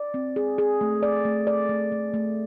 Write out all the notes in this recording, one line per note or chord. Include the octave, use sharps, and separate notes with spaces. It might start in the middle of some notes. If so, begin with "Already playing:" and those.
Already playing: D5
C4
G#4
G#4
A3
D5
A3
D5
A3
A3
A3